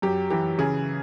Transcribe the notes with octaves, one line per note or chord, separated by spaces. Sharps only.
F#2 G4
E3 G4
C#3 G#4